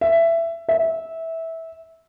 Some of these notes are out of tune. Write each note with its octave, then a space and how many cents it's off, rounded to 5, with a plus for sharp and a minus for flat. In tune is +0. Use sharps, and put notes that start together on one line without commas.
E5 +15
E5 -15